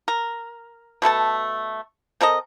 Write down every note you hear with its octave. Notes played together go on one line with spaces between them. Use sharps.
A#4
B2 A3 A4 A5
C4 A4 A#4 D#5